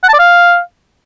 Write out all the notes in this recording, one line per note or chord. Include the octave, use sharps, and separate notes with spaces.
F#5
A5
D5
F5